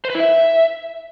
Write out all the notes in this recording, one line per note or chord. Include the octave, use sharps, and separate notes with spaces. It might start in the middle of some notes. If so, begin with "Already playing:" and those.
C5
B4
E4
E5